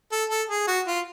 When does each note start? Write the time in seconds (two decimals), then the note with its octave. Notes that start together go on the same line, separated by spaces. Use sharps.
0.12 A4
0.30 A4
0.50 G#4
0.67 F#4
0.87 F4